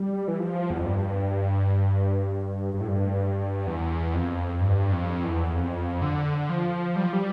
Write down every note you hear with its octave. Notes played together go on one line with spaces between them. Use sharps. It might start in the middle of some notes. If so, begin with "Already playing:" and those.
Already playing: G3
E3
F3
E2
F2
G2
G2
A2
G2
E2
F2
G2
F2
E2
F2
D3
F3
G3
F3
G3